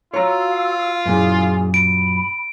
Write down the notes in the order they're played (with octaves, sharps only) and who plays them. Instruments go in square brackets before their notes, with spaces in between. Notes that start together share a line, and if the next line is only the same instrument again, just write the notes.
[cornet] F4 [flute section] F#4 F5 E6 [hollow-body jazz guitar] C#5 A#5
[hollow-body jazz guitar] F#2 A#2 [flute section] E4 G#4 G#5
[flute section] B5 [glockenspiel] D7